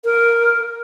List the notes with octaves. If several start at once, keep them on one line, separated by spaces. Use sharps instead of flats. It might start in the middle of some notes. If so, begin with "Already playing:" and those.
A#4